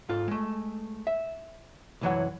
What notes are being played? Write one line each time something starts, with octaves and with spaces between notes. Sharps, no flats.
G#2 F4 A4
G#3 A3
E5
C2 F#2 E3 F#3 C#5 F#5